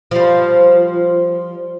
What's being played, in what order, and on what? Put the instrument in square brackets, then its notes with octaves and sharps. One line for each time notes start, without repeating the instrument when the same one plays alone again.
[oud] F3 G3